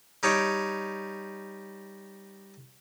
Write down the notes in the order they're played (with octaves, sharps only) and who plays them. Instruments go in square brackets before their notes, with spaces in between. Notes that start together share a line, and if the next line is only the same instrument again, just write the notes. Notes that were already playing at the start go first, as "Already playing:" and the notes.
[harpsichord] G3 D#4 C#5 G5